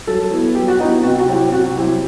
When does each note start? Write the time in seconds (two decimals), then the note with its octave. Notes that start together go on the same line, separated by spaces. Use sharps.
0.07 F#3 A4
0.31 B3 E4
0.55 F#3 G4
0.68 F#4
0.80 B3 D#4 E4
1.03 C3 F#4
1.19 F#4
1.27 F#3 C4 E4 G4
1.52 C3 F#4
1.76 F#3 C4 E4 G4